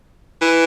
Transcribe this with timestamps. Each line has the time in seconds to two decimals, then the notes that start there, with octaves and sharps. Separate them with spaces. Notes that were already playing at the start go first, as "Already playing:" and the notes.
0.42 E3